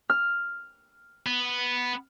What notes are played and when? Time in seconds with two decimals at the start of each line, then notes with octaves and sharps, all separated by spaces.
0.10 F6
1.26 B3